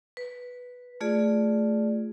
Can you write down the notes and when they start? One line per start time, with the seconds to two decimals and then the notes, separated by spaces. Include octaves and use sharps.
0.17 B4
1.01 A3 F4 G#4 D5